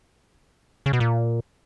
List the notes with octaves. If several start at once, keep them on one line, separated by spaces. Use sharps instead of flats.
C#3
B2
A#2